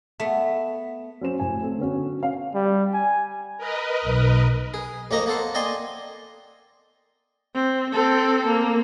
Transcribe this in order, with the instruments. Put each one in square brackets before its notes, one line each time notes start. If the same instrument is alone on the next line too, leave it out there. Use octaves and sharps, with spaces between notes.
[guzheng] A3 B3
[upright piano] F#3 C#4 C5 E7
F1 A2 G#5
A3 C4
D3 B3 C#4 F#4
C#4 F5
[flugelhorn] G3
G#5
[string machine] A#4 B4 D#5
[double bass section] B1
[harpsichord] G#4
A1 F2 A#3 D#4 D#5 A#5
A#3 B3 A4 C5
D5 D#5 G5 G#5 C6
[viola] C4
C4 A4
A#3